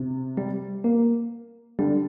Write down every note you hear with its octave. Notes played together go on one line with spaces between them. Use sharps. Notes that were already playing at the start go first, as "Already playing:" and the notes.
Already playing: C3
G3
A#3
D3 G3